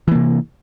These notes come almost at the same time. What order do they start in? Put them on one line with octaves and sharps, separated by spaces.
E3 A#3 C3